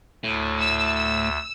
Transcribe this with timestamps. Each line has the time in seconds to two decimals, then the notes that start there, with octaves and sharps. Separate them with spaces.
0.24 D2 A2
0.59 E6